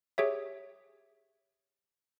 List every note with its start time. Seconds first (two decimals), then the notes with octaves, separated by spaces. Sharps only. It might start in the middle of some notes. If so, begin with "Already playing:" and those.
0.18 G4 G#4 C#5 E5